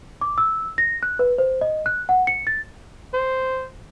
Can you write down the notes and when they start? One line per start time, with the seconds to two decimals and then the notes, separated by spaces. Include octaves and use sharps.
0.21 D6
0.38 E6
0.78 A#6
1.03 F#6
1.19 B4
1.38 C5
1.61 D#5
1.86 F#6
2.09 F#5
2.27 C#7
2.47 A6
3.14 C5